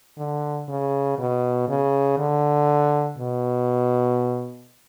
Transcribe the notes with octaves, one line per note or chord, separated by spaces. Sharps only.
D3
C#3
B2
C#3
D3
B2